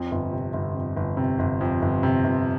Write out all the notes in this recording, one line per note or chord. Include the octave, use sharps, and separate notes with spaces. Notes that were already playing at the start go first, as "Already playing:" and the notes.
Already playing: F2
G1
C3
G1
F2
G1
C3
G1
F2
G1
C3
G1